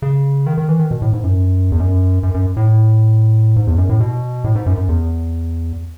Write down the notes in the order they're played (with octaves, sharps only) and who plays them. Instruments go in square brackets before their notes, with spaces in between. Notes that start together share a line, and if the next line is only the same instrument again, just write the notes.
[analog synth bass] C#3
D#3
D#3
E3
D#3
B2
A2
G#2
F#2
E2
F#2
F#2
F#2
A2
G#2
E2
F#2
A2
B2
A2
G#2
F#2
F#2
E2